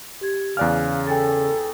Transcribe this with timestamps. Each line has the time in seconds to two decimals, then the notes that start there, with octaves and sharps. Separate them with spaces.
0.21 G4 G#6
0.57 E2 C#3 D5 F5 G#5 F6 F#6
1.07 A4 G5 G#5 A6